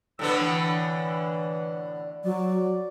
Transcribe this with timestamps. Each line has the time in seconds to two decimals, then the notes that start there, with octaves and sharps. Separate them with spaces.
0.19 A2 D3 B3 E6
0.40 E3
2.24 F#3 D5